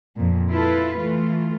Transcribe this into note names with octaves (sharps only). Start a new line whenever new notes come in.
F2 A#2
E4 F4 A4 B4
E3 A3 F4